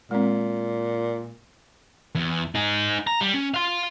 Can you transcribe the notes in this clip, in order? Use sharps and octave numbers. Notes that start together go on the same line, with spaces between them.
A#2 G#3 C4
E2
D#4 G#4
A#5
G3
C#4
F5 C6